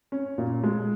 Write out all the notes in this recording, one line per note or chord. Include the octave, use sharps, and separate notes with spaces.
C#4
A#2
G#3